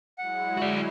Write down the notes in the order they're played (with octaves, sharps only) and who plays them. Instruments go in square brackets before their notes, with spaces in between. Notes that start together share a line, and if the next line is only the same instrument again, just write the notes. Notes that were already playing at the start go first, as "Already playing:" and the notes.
[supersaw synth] F#3 G#3 E4 [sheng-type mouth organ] F#5
[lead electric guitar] F#4 D5